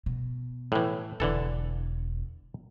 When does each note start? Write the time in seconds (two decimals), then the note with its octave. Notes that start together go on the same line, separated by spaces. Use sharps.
0.06 B2
0.72 A2 E3
1.20 E1 D3 E3 A4